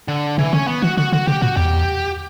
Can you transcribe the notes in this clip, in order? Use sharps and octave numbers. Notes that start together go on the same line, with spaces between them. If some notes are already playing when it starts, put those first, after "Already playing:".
D3
C#3 E3
D3 C#4
B3
E3 F#4
D3 F#4
D3 F#4
C#3 G4
A#2 F#4
E2 G4